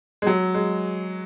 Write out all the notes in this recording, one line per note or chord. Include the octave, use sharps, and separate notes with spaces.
G#3
F#3
G#3